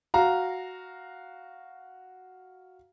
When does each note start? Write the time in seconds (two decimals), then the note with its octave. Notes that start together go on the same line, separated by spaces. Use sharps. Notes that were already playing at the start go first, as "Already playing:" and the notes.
0.14 F#4 F5 A#5